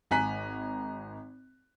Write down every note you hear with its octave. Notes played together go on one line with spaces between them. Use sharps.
G#1 G#5 A#5 F#6 B6